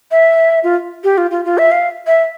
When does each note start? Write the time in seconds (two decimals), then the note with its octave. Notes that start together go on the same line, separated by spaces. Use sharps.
0.11 E5
0.64 F4
1.04 G4
1.18 F4
1.31 F4
1.45 F4
1.58 E5
1.71 F5
2.07 E5